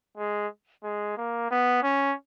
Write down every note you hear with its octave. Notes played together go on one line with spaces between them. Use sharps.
G#3
G#3
A#3
B3
C#4